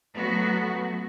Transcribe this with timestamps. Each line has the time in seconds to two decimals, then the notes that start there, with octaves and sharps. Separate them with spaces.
0.14 F#3 A3 B3 F#4